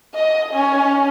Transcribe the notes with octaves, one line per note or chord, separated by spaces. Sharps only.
D#5
C#4